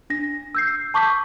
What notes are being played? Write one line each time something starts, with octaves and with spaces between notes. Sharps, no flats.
D4 A#6
E6 G6 C7
A5 C#6 D6 G6 B6